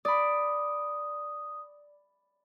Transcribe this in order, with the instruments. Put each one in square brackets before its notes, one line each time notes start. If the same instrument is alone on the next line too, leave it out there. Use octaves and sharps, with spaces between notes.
[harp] D5 B5 [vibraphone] D#6